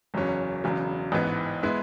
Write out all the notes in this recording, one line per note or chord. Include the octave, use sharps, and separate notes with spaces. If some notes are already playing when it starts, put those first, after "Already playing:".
F#1 E2 C#3 F#3 C#4
E1 E2 C#3 F#3
A1 G#2 E3 B3
G#3 B3 E4